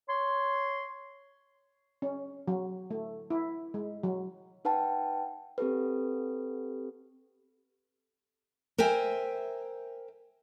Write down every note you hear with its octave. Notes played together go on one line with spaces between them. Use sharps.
C#5 C6
C#4
F#3
A3
E4
G#3
F#3
D#4 B4 F#5 G5 A5
C4 G4 A4 B4
A#4 C5 E5 G5 G#5